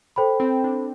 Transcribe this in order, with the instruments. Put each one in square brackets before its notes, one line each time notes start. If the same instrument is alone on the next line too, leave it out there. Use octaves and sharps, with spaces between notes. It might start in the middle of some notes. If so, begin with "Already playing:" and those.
[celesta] A4 C5 G5 B5
[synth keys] C4
D4